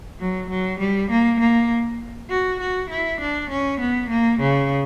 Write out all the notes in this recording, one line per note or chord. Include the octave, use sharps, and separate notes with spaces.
F#3
F#3
G3
A#3
A#3
F#4
F#4
E4
D4
C#4
B3
A#3
C#3